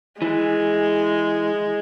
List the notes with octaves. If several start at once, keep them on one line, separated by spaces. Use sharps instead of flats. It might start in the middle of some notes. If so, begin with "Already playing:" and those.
E3 G#3